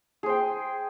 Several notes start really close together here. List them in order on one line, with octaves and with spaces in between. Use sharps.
G#4 C5 G5